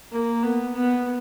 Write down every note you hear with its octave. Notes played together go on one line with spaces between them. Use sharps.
A#3
B3
B3